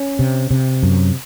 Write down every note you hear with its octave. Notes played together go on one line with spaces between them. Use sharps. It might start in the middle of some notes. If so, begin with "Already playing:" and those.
Already playing: C#4
C3
C3
F#2